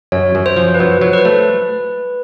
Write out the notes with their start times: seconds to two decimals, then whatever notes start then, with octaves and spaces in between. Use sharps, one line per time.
0.12 F#2 C#5
0.35 F#2
0.46 C5
0.56 F3
0.74 B4
0.79 F#3 C5
1.01 F#3
1.13 B4
1.25 A3